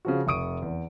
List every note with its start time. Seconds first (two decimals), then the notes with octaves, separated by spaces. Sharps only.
0.05 C#3 F3 F#4
0.27 F1 C#6 D#6 D7
0.62 E2